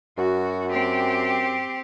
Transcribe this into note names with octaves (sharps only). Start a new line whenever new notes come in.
F#2 F#4
C4 G4